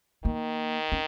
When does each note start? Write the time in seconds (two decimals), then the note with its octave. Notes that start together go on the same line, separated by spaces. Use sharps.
0.24 D#3 A#3
0.92 C#4